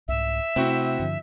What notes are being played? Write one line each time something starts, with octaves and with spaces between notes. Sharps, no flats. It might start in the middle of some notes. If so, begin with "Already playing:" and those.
C2 G#2 E5
C3 A3 C4 E4 F#4
G2 D3 F3